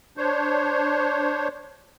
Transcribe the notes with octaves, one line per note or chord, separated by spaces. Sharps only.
D4 C5 C#5